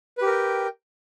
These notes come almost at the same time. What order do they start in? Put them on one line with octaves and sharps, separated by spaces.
B4 G4 A#4 G5